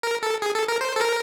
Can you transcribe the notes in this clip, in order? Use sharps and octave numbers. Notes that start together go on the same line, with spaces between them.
A#4
A4
G#4
A4
A#4
C5
A4
A#4